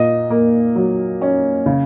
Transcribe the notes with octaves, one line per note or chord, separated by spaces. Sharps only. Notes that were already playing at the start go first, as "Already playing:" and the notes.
Already playing: A#2 D#5
A#3
F#3
C#4
C#3